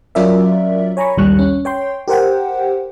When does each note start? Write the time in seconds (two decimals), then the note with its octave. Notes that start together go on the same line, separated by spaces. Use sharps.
0.15 F#3 C#4 F4 A#4 D5 E5
0.97 C#5 G#5 A#5 B5 C#6
1.17 A#1 D#2 G#2 G3 C#6 F#6
1.39 C#4
1.65 C#5 G5 C6
2.08 G4 A#4 C5 F#5 G5